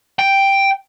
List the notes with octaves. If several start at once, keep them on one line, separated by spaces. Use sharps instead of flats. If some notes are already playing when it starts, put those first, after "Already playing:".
G5